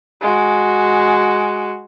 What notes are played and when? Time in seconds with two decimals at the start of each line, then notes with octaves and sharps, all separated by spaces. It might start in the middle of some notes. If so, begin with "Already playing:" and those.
0.21 G#3 F#4